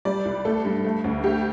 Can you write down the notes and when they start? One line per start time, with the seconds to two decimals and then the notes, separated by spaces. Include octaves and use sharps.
0.05 G3 D5
0.25 C2
0.45 A3 A4
0.65 G2
0.84 A3
1.04 D2
1.24 A3 G4